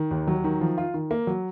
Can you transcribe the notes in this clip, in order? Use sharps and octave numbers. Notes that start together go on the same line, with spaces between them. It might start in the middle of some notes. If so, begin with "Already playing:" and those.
Already playing: D#3
D#2
F#3
D#3
F3
F4
D#3
A#3
F#3